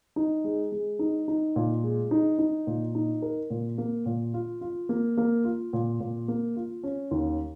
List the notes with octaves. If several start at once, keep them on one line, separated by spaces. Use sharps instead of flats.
D#4
G#3
G#3
D#4
D#4
A#2
G#3
D#4
D#4
A#2
D#4
A#4
A#2
A#3
A#2
F4
F4
A#3
A#3
F4
A#2
A#2
A#3
F4
C#4
D#2